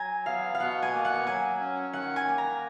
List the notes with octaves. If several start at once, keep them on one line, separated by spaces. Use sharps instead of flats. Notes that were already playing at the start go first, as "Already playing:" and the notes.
Already playing: F#3 G#5 A#5
B3 F5
F5
B2 F#5
G#5
A#3
F#5
F#3 G#5
C#4
D#3 F#5
G#5
A#3
A#5